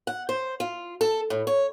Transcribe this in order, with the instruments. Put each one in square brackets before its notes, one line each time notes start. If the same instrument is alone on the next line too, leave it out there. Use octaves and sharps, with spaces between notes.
[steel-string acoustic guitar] F#5
C5
F4
A4
A2
C#5